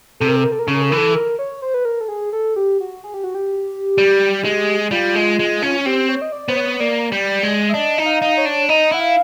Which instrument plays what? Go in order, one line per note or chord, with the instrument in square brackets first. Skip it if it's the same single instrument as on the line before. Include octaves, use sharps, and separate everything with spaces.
[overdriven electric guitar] C3 [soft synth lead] A4
[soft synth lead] A#4
A4
A#4
A4
A#4
[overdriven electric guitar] C#3 [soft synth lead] A4
[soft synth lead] A#4
A4
[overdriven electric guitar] E3 [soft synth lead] A#4
[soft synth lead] A4
A#4
C#5
C5
B4
A#4
A4
G#4
A4
G4
F#4
G#4
G4
F#4
G4
[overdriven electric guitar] G3
G#3
[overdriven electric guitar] G3 [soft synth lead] F4
[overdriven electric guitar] G#3
G#3
C#4
[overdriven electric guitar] C4 [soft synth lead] G4
[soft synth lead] C#5
D#5
D5
[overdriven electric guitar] B3 [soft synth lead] C5
[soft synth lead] C#5
[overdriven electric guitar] A#3 [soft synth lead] D5
[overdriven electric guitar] G3
G#3
[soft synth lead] E5
[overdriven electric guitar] D4 [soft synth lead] D#5
[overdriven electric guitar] D#4
[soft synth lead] F5
[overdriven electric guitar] D#4
[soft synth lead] C#5
[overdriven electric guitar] D4
[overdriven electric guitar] D#4 [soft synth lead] D#5
[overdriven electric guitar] E4 [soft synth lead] F#5
[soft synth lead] F5